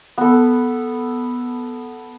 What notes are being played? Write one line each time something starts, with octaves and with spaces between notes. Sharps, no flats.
B3 A4